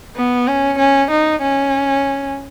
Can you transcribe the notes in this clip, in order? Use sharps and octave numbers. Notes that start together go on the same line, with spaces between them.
B3
C#4
C#4
D#4
C#4